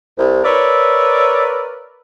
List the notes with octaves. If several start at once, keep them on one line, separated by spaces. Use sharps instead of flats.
C2
A#4 B4 C#5 D5 E5